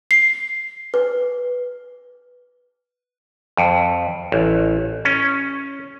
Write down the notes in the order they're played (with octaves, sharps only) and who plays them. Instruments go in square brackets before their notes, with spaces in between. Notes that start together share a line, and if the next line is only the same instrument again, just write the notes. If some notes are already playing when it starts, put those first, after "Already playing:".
[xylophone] C7
B4
[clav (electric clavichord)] F2
A1
C#4